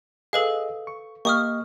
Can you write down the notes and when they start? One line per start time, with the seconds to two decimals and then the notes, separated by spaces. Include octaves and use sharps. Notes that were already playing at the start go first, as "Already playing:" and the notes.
0.33 G#4 A4 B4 D#5 F5 D#6
0.87 C#6
1.25 A#3 G4 D#5 C#6 D#6 F6